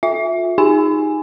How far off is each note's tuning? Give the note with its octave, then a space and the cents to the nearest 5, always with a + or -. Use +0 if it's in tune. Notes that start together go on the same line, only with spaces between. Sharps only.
F4 +30 E5 +0
D#4 +10 G#4 -30 G#5 +0